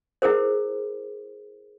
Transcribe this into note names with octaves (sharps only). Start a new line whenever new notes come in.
E4 G#4 A#4 C5